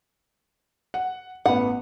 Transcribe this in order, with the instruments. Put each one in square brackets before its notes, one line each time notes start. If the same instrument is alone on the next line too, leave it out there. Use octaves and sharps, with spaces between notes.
[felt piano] F#5
[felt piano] A1 B3 [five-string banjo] F#5